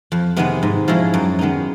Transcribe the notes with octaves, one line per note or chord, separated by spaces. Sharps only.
F2
C3 D#3 G#3 B3
G#2
F3 G#3 C#4 E4
F#2
D#3 G#3 B3 D#4